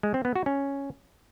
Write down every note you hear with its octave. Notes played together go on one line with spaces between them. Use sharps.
G#3
C4
B3
F#4
C#4